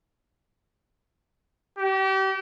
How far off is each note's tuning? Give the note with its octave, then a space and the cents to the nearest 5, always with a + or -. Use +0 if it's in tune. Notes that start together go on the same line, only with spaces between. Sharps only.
G4 -35